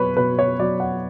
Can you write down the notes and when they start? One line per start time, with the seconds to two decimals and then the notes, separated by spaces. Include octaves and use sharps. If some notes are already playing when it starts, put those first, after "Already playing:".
Already playing: B2 F#3 B4 C#5
0.17 B2 B4
0.39 C#5
0.59 F#3 D5
0.80 F#5